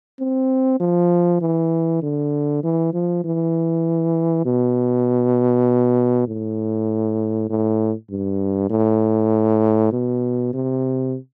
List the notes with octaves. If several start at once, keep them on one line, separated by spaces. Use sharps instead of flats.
C4
F3
E3
D3
E3
F3
E3
B2
A2
A2
G2
A2
B2
C3